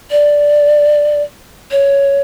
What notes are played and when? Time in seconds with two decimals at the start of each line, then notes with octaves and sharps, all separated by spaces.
0.11 D5
1.71 C#5